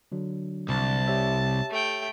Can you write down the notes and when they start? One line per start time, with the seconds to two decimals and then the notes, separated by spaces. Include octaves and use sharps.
0.12 D3 F#3 D4
0.69 C2 A5
1.08 G4 C#5 E5
1.71 A3 G5